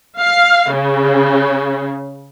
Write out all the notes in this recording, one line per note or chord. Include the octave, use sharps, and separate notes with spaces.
F5
C#3